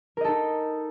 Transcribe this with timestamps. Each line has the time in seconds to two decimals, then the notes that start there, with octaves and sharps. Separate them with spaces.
0.17 A#4
0.21 D#5
0.24 A4
0.28 D#4